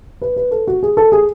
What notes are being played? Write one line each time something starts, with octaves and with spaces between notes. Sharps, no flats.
B4
B4
A4
F#4
G#4
A4
G#4